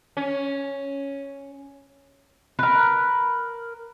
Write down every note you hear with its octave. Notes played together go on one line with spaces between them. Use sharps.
C#4
A#4 B4